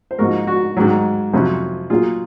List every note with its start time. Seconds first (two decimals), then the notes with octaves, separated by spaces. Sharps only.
0.11 C5
0.19 G#2 F3 A#3 D#4 F#4 A#4
0.47 F#4
0.77 G#2 D#3 F#3
1.33 F2 C3 F#3 C#4
1.90 A#2 F#3 A#3 F4 G#4